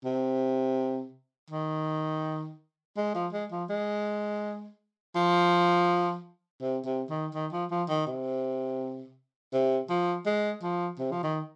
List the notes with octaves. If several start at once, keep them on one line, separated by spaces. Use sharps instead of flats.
C3
D#3
G#3
F3
G#3
F3
G#3
F3
C3
C3
D#3
D#3
F3
F3
D#3
C3
C3
F3
G#3
F3
C3
F3
D#3